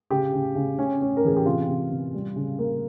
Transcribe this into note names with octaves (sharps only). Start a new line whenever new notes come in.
C#3 G4
C#3
C#3
C#4
C#4
A#4
E3 G#4
G4
C3 F4
C3
C3
G3
C#3
A#3